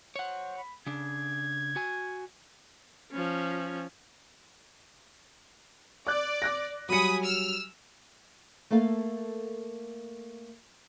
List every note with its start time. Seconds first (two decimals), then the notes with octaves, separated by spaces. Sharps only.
0.16 C5 C#5 F#5
0.57 B5
0.87 C#3 D4 G#6
1.76 F#4 G#5
3.12 F3 C#4
6.07 D5 D6 F#6
6.42 D6 F#6 A#6
6.89 F#3 G3 G#5 B5 D#6 C#7
7.22 E6 F6
8.70 A3 A#3 A4 F5